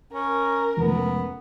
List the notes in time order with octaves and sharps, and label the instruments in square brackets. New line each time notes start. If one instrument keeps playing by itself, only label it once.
[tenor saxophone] C#4 [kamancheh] A#4
[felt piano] F1 C#2 [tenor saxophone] B3